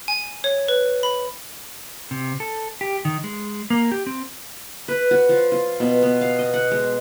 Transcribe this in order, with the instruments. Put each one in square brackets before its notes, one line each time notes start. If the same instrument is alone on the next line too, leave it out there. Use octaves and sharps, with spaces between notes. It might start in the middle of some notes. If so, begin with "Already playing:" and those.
[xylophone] G#5
C#5
B4
B5
[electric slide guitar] C3
A4
G4
D#3
G#3
A#3
G4
C4
[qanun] B4
F#4
F3
F4
B2
B3
F5
D#5
F#5
G#3